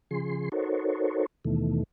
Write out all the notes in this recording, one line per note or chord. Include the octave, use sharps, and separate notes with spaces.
C#3 F3 G#4 C6
D#4 F#4 A4 A#4 C5 C#5
D#2 B2 D#3 E3 A3